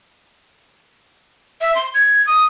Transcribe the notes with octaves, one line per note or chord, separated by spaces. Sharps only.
E5
C6
G#6
D#6